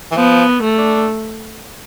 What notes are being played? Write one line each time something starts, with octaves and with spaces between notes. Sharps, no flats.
E3
F3 B3
A3
D4